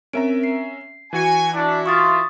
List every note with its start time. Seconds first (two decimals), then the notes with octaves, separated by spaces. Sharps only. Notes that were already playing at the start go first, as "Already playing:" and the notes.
0.13 C4 C#4 A#4 E5 A#5 D7
0.44 C7
1.13 E3 F#4 G#5 C#7
1.53 D4 E4
1.86 F4 C#6 D#6 A6